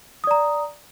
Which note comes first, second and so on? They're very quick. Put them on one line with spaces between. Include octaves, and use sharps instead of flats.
D#6 D5 A#5